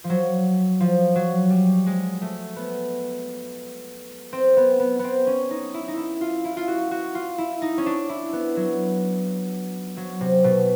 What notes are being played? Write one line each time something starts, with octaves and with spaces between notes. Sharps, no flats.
F3
F#3
F3
F#3
G3
G#3
A3
B3
C4
B3
B3
B3 C4
C#4
D#4
E4
D#4
E4
F4
E4
F4
F#4
F#4
F4
E4
D#4
C#4
D4
E4
B3
F#3
F#3
C3
B2